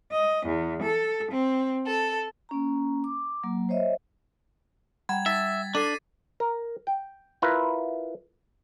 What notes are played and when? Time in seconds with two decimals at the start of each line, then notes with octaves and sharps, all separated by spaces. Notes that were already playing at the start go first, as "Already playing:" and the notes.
0.12 D#5
0.47 E2
0.82 A4
1.32 C4
1.87 A4
2.49 A#3 C#4 A#5
3.04 D6
3.43 F#3 A#3
3.69 C5 C#5 D#5 E5
5.09 G3 F#5 G5 A#5 B5 G#6
5.26 D#4 E5 A6 B6
5.75 D4 E4 A4 D6 C7 D#7
6.40 A#4
6.87 G5
7.42 E4 F4 A#4 B4